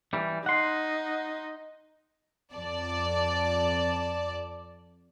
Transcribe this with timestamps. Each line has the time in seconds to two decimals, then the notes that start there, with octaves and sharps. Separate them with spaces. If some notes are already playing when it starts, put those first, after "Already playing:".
0.13 E3 G3
0.46 D#4 F#5 C6
2.54 F2 D5 A5